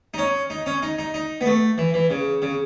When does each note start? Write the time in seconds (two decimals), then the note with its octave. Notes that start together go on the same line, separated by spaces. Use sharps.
0.14 D#4
0.18 C#4
0.50 D#4
0.66 C#4
0.82 D#4
0.99 D#4
1.14 D#4
1.41 B3
1.46 A3
1.78 E3
1.94 E3
2.10 C#3
2.42 C#3